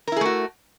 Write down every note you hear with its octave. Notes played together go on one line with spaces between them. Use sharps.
A3 E4 F#4 G#4 A#4